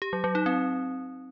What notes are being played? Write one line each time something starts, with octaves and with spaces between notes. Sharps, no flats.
G4
F#3
F#3
D#4
C4